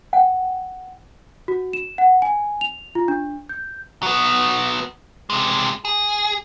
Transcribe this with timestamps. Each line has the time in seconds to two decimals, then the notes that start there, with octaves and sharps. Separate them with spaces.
0.13 F#5 G5
1.48 F#4
1.73 E7
1.98 F#5
2.22 G#5
2.61 F7
2.95 F4
3.08 D4
3.49 G6
4.03 F#3 B3
5.30 C3 G#3
5.85 G#4